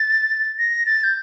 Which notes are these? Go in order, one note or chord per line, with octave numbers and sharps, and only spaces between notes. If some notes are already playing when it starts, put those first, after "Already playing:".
Already playing: A6
A#6
A6
G6